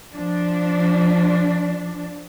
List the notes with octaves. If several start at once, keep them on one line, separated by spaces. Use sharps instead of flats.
F3 D4